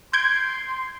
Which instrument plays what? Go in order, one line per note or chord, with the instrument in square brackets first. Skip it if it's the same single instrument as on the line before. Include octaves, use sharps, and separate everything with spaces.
[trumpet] C6 [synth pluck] G6 G#6 D7